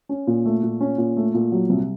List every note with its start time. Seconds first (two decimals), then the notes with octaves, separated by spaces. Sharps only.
0.09 C#4
0.27 A#2
0.45 A3
0.63 A#2
0.81 C#4
0.98 A#2
1.17 A3
1.34 A#2
1.52 F#3
1.69 C2